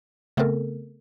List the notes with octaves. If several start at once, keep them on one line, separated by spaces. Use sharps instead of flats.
C#3 A3 B3 C4 A4 A#4